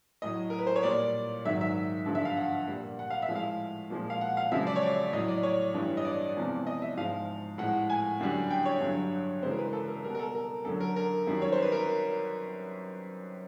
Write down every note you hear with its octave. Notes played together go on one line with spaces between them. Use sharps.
A2 F#3 D#5
A#4
B4
C5
C#5
A#2 G3 D5
G#2 D#3 F#3 E5
E5
G2 D3 F3
E5
F5
F#5
A#2 G3
F#5
F5
E5
A2 F3 G#3
F5
A#2 F3 G#3
F5
F#5
F5
F#2 C#3 F3 G#3 E5
D5
C#5
D5
A2 F#3 D#5
D5
C#5
G2 E3 G3
D#5
D5
E2 C3 F3 G#3
D#5
E5
G#2 F3 G#3 F5
A2 F3 G#3 F#5
G#5
F#2 D3 G3
G5
C#5
G2 D3 F#3
F#2 C#3 E3 G#3 C5
A#4
B4
A4
A#4
B2 G3 A#4
A#4
A4
A#4
F#2 D3 F#3 A4
A#4
A#4
F#2 D#3 G3
C#5
C5
B4
A#4